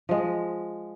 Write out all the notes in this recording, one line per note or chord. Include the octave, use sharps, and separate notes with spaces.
F3 G#3